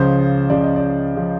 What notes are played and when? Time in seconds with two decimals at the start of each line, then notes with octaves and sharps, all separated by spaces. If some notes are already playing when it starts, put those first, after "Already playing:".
Already playing: C#2 C#3 F3 C5
0.50 C#2 C#3 F3 D5
0.63 D#5
0.76 D5
1.17 C#3 F3